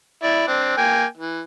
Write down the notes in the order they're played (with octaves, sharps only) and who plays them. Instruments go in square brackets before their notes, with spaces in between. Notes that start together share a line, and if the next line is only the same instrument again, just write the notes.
[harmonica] E4 D5
C4 D4
A#3 G5 G#5
E3